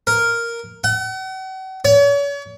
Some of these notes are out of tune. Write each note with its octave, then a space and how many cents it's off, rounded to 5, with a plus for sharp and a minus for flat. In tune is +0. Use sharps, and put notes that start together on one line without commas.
A#4 +0
F#5 +40
C#5 +40